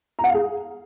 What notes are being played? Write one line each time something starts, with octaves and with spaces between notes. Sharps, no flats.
A#5
F#5
F5
G#4